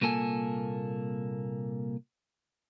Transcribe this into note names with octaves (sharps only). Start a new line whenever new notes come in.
C2 A#2 A#3 A4 G#5